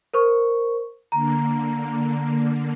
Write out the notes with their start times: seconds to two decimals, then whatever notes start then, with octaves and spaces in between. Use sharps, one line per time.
0.14 A#4 C5 C#6
1.12 D3 A#3 A#5